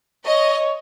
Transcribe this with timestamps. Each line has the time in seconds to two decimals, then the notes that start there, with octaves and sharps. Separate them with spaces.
0.27 C#5 D#5